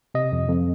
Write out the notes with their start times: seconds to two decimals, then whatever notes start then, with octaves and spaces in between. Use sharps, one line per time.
0.15 C3 D#5
0.32 F2
0.49 F2